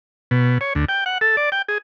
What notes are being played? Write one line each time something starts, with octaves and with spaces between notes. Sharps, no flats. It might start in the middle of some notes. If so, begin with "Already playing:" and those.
B2
C#5
D2
G5
F#5
A4
D5
G5
G#4